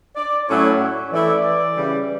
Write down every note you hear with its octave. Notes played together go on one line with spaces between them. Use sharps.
D5
A2 F#3 A3 C#4 E4 C#5
E3 A3 E4 D5
C#3 E3 G3